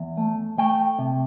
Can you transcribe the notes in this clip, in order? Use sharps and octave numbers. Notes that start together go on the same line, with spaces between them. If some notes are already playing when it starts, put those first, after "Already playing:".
Already playing: E2
A3
A3 G5
C3